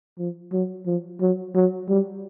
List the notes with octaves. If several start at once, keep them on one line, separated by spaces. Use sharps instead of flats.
F3
F#3
F3
F#3
F#3
G3